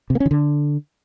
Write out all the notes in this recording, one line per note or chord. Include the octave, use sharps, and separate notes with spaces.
C3
A#3
C#4
D#3
D3